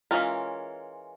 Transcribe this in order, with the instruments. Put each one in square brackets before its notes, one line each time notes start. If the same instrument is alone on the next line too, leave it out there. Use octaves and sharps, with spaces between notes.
[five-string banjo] E3 G#3 C#4 F4 A#4